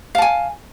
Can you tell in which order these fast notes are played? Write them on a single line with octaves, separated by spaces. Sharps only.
F5 A5 G#5